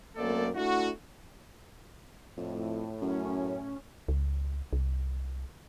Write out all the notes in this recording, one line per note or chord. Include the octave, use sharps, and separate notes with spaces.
F#2 A3 A#3 C4 A4 D5
A3 D4 E4 F#4
F2 A2
F#2 C#4
C#2
C2